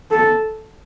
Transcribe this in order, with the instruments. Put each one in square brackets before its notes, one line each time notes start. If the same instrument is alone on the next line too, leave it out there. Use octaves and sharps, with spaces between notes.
[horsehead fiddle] A4